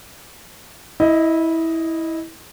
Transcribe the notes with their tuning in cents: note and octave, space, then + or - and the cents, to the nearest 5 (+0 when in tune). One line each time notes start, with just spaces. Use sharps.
E4 -15 D#5 +5